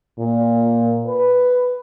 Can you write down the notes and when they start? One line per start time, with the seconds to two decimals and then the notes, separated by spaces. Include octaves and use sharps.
0.19 A#2
1.06 B4